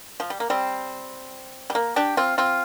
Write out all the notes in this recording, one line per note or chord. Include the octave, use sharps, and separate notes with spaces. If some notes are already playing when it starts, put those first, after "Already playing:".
F3
G3
A#3
G3 C4
G3
A#3
D4 G4
C4 F4
C4 F4